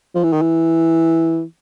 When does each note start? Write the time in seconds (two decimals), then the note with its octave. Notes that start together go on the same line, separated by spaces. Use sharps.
0.15 F3
0.24 E3
0.32 D#3
0.42 E3